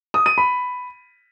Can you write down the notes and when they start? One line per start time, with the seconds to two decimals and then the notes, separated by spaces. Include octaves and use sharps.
0.14 D#6
0.26 D#7
0.38 B5